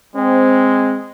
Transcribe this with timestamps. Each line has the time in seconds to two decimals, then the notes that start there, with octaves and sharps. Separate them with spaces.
0.16 G#3 C4